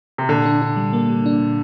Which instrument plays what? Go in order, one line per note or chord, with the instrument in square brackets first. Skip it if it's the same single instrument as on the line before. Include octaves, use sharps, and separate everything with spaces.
[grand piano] C3
[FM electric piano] A#2 [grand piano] D3
[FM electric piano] D4
D4
G3
A#3
G3
D4
A#2